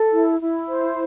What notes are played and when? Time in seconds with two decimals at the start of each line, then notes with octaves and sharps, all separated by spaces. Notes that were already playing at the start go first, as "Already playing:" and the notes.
Already playing: A4
0.12 E4
0.41 E4
0.69 C5